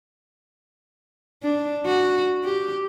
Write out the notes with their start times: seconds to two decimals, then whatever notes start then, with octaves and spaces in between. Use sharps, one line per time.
1.43 D4
1.86 F#4
2.44 G4